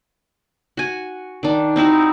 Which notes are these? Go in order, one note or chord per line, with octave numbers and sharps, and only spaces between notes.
F#4 G#5
D#3 D4
C4 D#4 E4 F#4